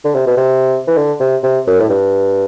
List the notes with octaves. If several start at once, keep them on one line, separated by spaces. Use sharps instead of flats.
D3
C3
B2
C3
E3
D3
C3
C3
F#2
A2
G2